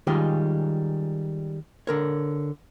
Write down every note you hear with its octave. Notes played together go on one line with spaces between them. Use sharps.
D#3 G3 G#3 C#4 F4 G4
D3 A#4 C#5